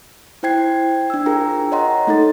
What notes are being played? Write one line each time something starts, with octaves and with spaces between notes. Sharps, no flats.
E4 C5 G5 G#6 C7
D4 E6
F4 G#4 A#4 G5 A#5
C#5 D#5 F#5 A#5 C6
A3 D#4 A4 A6